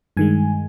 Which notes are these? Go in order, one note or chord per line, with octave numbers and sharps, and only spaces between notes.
G2 D#3 G#3 G#5